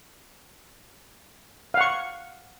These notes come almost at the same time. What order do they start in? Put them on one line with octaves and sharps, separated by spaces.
F5 F#5 C#6